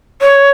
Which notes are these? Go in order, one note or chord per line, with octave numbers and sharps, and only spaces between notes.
C#5